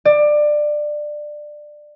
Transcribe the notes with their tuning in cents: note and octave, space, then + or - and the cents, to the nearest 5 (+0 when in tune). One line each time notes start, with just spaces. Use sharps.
D5 +20